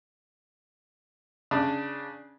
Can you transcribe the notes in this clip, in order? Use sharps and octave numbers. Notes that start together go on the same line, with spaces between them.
C#3 D4